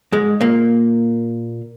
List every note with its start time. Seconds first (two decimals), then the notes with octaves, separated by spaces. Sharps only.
0.12 G#2 G#3
0.41 A#2 A#3